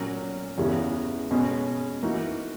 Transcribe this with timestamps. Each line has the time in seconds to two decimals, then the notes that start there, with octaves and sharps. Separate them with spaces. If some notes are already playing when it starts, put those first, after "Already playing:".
Already playing: A#2 F#3 A#3 C#4
0.58 E2 C#3 E3 B3
1.31 B2 G#3 C#4 G#4
2.03 E3 A#3 D#4 F#4